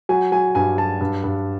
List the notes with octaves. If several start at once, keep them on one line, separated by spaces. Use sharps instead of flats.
F#3 G#5
F#3 G#5
G2 G#5
F#3 A5
G2
G2